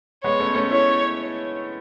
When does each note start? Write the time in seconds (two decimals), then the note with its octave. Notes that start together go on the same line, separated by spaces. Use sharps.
0.24 G#3 B3 C#5
0.39 A3 C#4
0.55 A3 C#4
0.70 C#4 E4 C#5